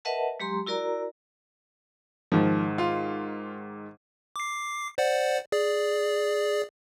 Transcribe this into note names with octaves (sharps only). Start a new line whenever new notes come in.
A#4 B4 D#5 E5 F#5 A5
F#3 G#3 G4 A#5 C6
E4 F#4 A#4 D5 A#5
G#2 D#3 F3
F4
D6 C7
C5 D5 F#5
G#4 D5